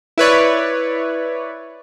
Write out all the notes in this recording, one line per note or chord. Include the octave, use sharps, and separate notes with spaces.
E4 B4 C#5 D5